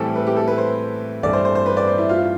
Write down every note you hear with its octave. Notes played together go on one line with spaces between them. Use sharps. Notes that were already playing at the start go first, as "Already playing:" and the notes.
Already playing: A2 E3 G3 C4 G4 A4
B4
G4
A4
B4
C5
G2 E3 A3 C4 D5
C5
C5
C5
B4
D5
C5
E4
F4